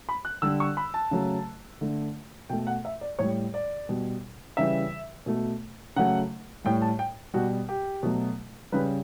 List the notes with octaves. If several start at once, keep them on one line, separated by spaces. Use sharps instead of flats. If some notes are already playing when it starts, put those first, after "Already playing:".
B5
F#6
D3 G3 E6
C#6
B5
A5
C#3 F#3 A3
D3 A3
B2 A3 G5
F#5
E5
D5
A2 G3 C#5
D5
B2 G3
C#3 E3 G3 E5
B2 A3
C#3 F#3 A3 F#5
A2 G3 G5
A5
G5
B2 G3 F#4
G4
B2 F#3 A3
C#3 G3 B4